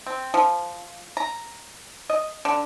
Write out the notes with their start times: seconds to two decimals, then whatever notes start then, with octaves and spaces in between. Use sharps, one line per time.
0.07 C4
0.34 F3
1.17 A#5
2.10 D#5
2.45 D3